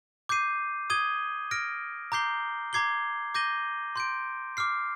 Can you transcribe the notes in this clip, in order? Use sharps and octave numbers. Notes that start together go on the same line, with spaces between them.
D6 G6 C7 D#7
D#6 G#6 D#7 G7
F6 A#6 D7
A#5 D6 G6 C7 G7
A#5 D6 G#6 C7 G7
D6 G6 A#6 D#7 G7
C6 G6 D7
D6 F6 C7